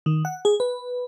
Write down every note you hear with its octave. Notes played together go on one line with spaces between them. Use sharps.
D#3
F#5
G#4
B4